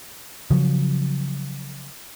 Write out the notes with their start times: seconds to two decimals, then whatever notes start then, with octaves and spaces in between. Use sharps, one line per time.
0.51 C#3 F3 F#3